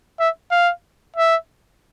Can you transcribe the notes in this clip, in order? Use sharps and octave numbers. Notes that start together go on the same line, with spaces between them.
E5
F5
E5